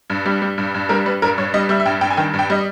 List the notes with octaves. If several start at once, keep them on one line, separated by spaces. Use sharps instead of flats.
G2
G3
G3
G2
G2
G3 A#4
G3 B4
G2 A#4
G2 C#5
G3 D#5
G3 E5
E5
G2 G5
G2 G5
G#5
D#3 G5
G2
G5
G3 D#5